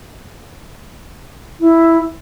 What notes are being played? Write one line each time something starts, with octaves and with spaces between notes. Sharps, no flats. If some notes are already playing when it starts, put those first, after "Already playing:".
E4